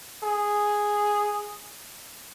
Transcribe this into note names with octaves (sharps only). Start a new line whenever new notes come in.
G#4